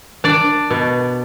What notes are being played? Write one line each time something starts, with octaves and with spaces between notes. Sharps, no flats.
D4 D5
B2